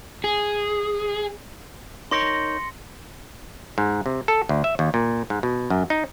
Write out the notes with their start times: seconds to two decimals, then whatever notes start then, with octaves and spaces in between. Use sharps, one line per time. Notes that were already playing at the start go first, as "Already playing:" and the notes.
0.24 G#4
2.11 D#4 A#4 C#5 C6 A#6 C#7
3.78 G#2
4.06 C3
4.28 A4
4.49 D2
4.64 E5
4.79 D#2
4.94 A#2
5.30 G#2
5.43 B2
5.70 F#2
5.90 D#4